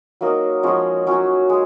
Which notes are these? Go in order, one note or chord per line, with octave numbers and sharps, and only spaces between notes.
F#3 A#3 D#4 A#4
F3 G#3 C#4 F#4
F#3 C#4 F#4
G#3